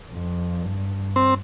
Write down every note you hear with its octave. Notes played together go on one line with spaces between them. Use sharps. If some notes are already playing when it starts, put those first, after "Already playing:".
F2
G2
C4